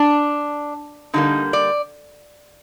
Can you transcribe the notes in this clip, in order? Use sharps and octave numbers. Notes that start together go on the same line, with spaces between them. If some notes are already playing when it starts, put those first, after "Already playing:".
Already playing: D4
D3 G3 A#3 D#4
D5